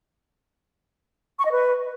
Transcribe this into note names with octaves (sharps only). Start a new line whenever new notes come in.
C#6
D#5
B4